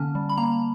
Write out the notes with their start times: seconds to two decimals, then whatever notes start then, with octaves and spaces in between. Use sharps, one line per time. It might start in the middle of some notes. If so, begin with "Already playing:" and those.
Already playing: D3 A#3 C#4 A5
0.15 G3
0.29 B5
0.38 A#3 A#5